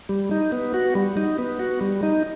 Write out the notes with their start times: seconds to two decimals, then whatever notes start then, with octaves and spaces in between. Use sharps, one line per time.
0.09 G3
0.31 D#4
0.52 B3
0.74 F#4
0.95 G3
1.17 D#4
1.38 B3
1.59 F#4
1.81 G3
2.03 D#4